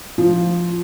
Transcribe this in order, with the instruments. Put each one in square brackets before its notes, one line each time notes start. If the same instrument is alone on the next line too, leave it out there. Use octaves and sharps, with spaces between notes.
[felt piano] F3